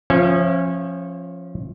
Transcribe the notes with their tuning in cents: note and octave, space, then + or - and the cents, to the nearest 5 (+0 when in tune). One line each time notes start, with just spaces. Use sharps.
F3 +5 C#4 -20 E5 +25